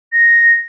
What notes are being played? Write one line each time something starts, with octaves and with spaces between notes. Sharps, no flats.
A#6